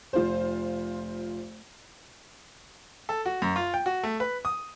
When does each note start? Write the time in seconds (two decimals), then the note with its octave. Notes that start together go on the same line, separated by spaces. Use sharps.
0.13 F1 F4 C5
3.09 A4
3.26 F#4
3.42 F#2
3.56 F4
3.74 G5
3.86 F#4
4.03 A3
4.20 B4
4.45 D#6